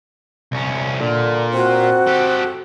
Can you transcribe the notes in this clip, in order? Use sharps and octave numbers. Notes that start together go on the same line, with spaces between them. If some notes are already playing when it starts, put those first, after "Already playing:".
C2 C#4
A#2 D3
C4 F#4
G4 A4